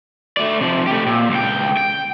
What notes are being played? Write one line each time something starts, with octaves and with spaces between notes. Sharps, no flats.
A3 D5
C3 F3
A3 G4
A#2
C#2 G5
G5